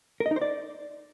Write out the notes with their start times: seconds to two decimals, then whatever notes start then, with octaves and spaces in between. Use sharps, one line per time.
0.20 A#4
0.26 D#5
0.31 D#4
0.36 C5
0.41 D5